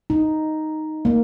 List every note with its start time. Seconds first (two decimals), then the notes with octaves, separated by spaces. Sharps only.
0.10 D#4
1.05 A#3